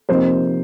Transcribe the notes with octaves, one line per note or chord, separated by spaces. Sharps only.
C3 F3 A#3 D#4 C5